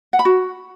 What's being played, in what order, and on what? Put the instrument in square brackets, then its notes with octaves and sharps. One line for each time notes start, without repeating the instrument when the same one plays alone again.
[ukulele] F#5
B5
F#4